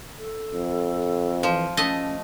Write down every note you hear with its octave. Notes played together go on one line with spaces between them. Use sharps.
A4
F2
E3 F3
A3 C#4 D#5